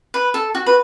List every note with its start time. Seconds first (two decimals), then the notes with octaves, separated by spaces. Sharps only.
0.14 B4
0.34 A4
0.55 F#4
0.66 B4